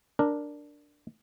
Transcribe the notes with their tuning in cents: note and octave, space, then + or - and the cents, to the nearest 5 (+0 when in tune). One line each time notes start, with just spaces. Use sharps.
D4 +0 A#4 +0